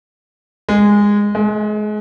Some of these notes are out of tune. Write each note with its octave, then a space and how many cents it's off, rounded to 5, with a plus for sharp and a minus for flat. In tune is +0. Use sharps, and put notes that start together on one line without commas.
G#3 -15
G#3 +30